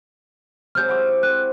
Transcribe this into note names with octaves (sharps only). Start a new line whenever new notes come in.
C3 F#3 G#3 F6 G6
E4 F#4 D6
C4 F#6